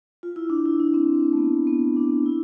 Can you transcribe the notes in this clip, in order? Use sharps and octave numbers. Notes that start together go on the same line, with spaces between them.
F4
E4
D4
E4
D4
C4
A3
B3
B3
D4
E4